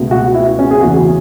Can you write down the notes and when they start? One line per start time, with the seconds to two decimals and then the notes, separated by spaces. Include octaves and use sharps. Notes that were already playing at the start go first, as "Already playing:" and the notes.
Already playing: C#2 B2 A3
0.11 F#4
0.34 E4
0.59 C#4
0.71 G#4
0.81 E2 C#3 E3 A3 F#4